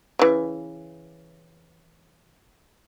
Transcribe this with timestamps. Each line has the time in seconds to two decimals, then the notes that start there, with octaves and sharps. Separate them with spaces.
0.19 C#3 E3